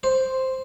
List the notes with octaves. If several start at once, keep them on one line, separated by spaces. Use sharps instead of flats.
C5